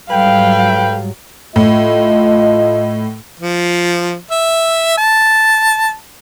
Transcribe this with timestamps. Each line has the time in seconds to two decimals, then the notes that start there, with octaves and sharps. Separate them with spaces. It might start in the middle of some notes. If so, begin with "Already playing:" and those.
0.11 G#2 F#3 G3 A4 B4 F5 G5
1.56 A2 A3 F4 D#5
3.40 F3
4.31 E5
4.98 A5